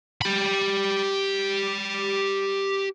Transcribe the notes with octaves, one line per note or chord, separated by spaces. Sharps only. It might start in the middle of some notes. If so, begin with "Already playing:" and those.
G4 B5